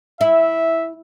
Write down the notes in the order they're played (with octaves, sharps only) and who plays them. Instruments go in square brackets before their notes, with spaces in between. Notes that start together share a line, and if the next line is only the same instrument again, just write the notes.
[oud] E4 [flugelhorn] E5